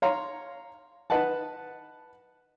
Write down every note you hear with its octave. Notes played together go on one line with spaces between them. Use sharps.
C#5 F5 A#5 C6
B4 D#5 F#5 A5